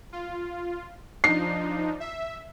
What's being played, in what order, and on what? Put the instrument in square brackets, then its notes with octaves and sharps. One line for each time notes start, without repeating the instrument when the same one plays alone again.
[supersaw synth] F4
[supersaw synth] F3 D4 D#4 [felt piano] C7
[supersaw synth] E5